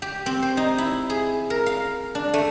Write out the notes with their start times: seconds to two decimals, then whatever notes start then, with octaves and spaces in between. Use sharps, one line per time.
0.02 G4
0.26 C4
0.42 C5
0.57 D#4
0.78 E4
1.10 G#4
1.50 A#4
1.66 F5
2.15 D4
2.34 A3